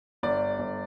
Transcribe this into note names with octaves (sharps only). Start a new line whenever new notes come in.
G1 D5
G1